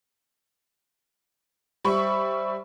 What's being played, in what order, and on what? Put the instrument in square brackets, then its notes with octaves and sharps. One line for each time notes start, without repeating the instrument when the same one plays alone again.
[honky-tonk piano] G3 B5 C#6 [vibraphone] C5 E5 E6